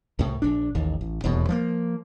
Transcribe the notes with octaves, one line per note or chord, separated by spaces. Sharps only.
C2 A2
A#1 D4
A1 D#2
A1
D#1 E2 B2
F3 G#3 A#3